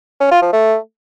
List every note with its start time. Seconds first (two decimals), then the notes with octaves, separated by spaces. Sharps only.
0.20 C#4
0.31 F4
0.42 F3
0.53 A3